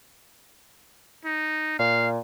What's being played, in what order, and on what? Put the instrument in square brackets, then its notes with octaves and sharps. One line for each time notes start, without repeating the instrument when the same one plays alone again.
[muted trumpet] D#4
[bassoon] A#2 [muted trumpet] F5